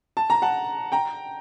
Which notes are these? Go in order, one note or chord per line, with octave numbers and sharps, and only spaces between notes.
A5
A#5
F#5 A5
G5 A#5